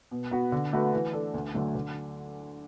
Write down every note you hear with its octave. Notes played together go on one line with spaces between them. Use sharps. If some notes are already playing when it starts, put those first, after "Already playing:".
B2
B3 F#4 B4
D3
A3 F#4 B4
E3
D4 A4
D2
D3 F#3 A3
D3